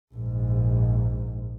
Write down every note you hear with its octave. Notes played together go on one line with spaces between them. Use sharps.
A#1 G#2